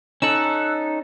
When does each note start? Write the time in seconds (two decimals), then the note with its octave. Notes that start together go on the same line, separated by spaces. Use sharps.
0.22 C#4 D#4 A4 E6 F#6